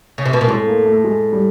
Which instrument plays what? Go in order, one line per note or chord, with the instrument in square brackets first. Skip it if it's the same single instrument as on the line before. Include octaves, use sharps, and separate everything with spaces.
[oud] C#3
C3
B2
A#2
[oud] A2 [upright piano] G#3
[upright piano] A#3
A3
G#3
G3